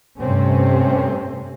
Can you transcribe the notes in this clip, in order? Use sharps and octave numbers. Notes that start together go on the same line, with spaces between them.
G2 C3 A3 C4 C#4